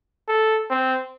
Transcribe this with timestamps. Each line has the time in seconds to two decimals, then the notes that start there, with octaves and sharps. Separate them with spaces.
0.28 A4
0.70 C4